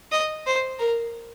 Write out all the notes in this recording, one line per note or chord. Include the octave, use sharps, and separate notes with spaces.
D#5
C5
A#4